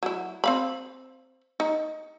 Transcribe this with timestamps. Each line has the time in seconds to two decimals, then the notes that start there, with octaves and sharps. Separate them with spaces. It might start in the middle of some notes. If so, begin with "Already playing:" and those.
0.03 F#3 E4
0.44 C4 F5 B5
1.60 D#4